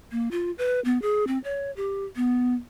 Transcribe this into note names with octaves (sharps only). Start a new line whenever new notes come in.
A#3
F4
B4
B3
G#4
C4
C#5
G4
B3